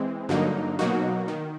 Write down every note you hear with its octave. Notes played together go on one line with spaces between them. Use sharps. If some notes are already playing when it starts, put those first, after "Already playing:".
Already playing: E3 G#3 C4
G2 D3 F#3 A#3 D#4
B2 F#3 A#3 D#4 F#4
D#3